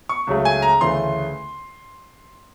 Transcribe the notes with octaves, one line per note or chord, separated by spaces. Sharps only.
C#6
C#2 C#3 F#3 A3
G#5
A#5
D2 C#3 E3 A3 C6